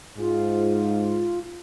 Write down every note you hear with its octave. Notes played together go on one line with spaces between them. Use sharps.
G#2 F4